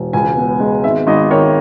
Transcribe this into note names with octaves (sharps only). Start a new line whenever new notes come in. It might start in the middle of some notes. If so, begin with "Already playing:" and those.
Already playing: E1
C#2 G#5
B3
G#3
G#1 E5
G#1 D#5
D#3 C#5